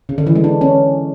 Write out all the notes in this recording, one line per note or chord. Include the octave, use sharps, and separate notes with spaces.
C#3
D3
E3
G#3
D4
C#4